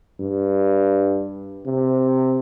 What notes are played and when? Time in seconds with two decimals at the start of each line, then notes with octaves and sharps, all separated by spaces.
0.21 G2
1.67 C3